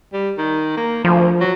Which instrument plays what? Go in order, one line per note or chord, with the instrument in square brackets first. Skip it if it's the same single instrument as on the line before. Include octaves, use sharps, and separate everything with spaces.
[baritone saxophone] G3
D#3
A#3
[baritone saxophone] D2 [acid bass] F3
[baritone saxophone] F#3